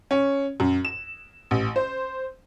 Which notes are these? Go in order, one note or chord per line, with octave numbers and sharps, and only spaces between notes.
C#4
F#2
E7
A1
C5